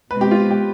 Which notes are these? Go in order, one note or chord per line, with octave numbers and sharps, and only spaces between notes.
B2 G#3 C4 B4
G4
F4
G4